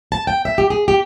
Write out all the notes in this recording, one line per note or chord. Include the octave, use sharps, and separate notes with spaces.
A5
G5
E5
G4
G#4
G4